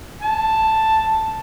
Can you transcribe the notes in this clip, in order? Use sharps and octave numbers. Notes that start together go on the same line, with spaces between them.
A5